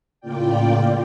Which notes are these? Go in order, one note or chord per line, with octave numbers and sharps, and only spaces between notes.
A2 C#3 A#3 F4 D5 G5